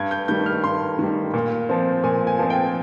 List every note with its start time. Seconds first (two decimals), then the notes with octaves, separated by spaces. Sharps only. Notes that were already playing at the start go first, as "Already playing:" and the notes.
Already playing: G2 G#6
0.11 G6
0.28 D#3 G3 G6
0.46 F6
0.64 G2 C6
0.99 D#3 G3
1.34 A#2
1.69 F3 C4
2.04 A#2 G#5
2.27 G#5
2.39 F3 C4
2.50 G5